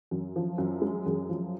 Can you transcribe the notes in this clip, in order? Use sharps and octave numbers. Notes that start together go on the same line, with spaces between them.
F#2
F3
F#2
G#3
F#2
F3